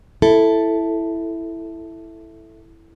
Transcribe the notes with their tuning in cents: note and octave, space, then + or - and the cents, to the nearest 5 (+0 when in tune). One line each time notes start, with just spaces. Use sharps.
E4 +0 A4 +0